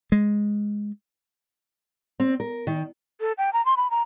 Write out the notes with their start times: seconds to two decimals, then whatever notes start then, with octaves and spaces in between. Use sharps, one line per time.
0.12 G#3
2.20 C4
2.40 A#4
2.67 D#3
3.21 A4
3.38 G5
3.53 A#5
3.65 C6
3.77 B5
3.91 A#5